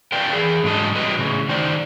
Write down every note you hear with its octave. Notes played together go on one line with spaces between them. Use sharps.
A#4 B4 D5 F5 G5
E3 G#4
G#2 D3 F#3 G#3 A4 D#5
F#3 G3 B4 D#5
A2 C#3
D#3 D#4 C5 D5